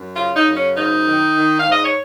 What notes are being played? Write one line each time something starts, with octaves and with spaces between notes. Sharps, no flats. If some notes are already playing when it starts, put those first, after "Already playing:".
Already playing: F#2
C#3 F4
D#4
F#2
C#4
G#2 D#4
D#3
D#3
F5
G#2
D#5
C#5